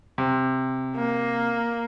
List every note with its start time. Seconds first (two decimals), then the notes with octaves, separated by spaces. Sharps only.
0.18 C3
0.96 A#3